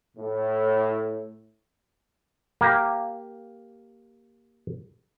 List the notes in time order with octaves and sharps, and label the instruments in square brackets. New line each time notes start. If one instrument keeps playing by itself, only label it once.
[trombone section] A2
[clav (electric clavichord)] A#3 G4